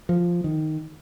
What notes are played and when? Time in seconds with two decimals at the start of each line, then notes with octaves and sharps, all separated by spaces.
0.09 F3
0.44 D#3